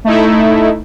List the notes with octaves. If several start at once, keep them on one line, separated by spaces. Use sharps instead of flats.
A3 D#4 E4